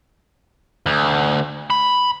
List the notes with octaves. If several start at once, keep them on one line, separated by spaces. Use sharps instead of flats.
D2
B5